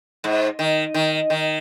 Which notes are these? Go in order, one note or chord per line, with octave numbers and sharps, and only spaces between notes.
G#2
D#3
D#3
D#3